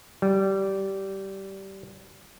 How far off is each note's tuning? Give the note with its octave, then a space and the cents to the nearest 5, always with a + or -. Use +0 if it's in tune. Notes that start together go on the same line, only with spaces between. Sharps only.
G3 -20